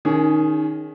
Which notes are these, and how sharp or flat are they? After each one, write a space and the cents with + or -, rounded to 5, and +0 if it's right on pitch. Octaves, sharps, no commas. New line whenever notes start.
D#3 +0 C#4 +30 G#4 +0